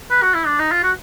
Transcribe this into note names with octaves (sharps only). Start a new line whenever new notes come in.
B4
F#4
E4
D4
D#4
F4
F#4